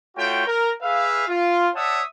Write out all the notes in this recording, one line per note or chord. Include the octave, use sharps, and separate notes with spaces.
A3 F4 F#4 C#5 G5
A#4
G#4 B4 E5 F5
F4
C#5 D5 E5 F#5 A5 D#6